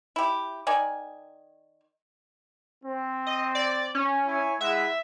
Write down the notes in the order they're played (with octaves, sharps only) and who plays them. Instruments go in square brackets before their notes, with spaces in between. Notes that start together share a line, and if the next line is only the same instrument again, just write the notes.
[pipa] E4 G4
D#3 D5 G#5
[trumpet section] C4
[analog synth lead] D#5
D5
C#4
[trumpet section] E4 C#5 G#5
[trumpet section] G#3 E4 F#5 [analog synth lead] E5